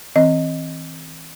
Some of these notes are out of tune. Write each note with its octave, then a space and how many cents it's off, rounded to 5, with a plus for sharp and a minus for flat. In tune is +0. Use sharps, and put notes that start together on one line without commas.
E3 -30 C4 +0 D#5 +0